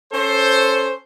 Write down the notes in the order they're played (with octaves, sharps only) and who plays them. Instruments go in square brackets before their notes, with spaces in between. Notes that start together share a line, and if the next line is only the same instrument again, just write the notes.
[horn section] C#4 A4 C5